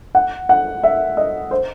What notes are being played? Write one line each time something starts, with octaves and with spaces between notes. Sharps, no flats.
F#5
F#5
E5
D#5
C5